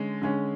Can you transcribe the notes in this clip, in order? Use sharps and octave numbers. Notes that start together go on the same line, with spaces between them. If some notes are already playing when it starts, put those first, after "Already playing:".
Already playing: D3 G#3 C#4
D3 G#3 C#4